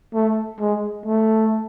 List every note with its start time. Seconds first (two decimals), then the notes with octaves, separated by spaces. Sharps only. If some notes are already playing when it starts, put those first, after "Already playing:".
0.14 A3
0.60 G#3
1.06 A3